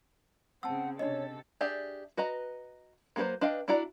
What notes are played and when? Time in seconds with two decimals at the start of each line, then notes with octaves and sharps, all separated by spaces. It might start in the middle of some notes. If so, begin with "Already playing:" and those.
0.63 C#3 C4 F#5 A5 E6
0.99 C3 D4 A4 C#5 D#5
1.61 D4 G4 G#4 D5 E5
2.17 F#4 B4 D#5 A#5
3.16 F#3 A#3 A4 B4 C5
3.41 D4 B4 D#5 F5 G5
3.68 D4 E4 F#4 D5 A#5